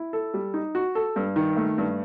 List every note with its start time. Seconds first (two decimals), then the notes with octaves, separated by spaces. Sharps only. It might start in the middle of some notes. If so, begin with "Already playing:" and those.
Already playing: E4
0.13 A4
0.34 G3
0.54 D#4
0.75 F#4
0.95 A4
1.16 G2
1.36 D#3
1.57 A3
1.78 G2